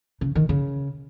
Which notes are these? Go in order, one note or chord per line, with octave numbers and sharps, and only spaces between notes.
C#3
D#3
C#3